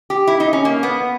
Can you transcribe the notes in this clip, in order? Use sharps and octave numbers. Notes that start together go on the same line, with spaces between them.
G4
E4
D#4
C#4
A#3
B3